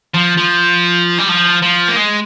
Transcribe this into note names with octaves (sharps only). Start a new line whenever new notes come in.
F3
F3
G3
F3
F3
A#3
G#3